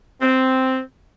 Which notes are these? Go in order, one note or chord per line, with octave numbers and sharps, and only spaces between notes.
C4